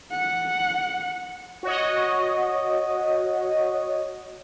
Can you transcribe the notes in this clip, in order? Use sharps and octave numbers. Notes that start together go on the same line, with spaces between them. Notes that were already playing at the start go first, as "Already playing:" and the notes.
F#5
F#4 C#5 D#5